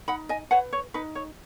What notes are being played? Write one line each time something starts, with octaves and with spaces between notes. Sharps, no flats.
D#4 F#5 B5
D#5 G#5
B4 C#5 F#5
C#5
D#4 B4
C#5